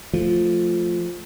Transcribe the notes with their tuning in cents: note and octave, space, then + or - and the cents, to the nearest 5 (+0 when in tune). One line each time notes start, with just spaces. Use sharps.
F3 +0 A3 +0